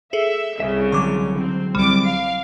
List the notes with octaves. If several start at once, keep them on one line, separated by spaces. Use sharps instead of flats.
G#4 A4 E5
C2 C#3 E5
D3 F#3 G#3 C#6 D6
C4
C2 G3 D6
F5